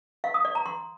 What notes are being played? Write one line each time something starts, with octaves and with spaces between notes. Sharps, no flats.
F5
D#6
D5
A#5
C6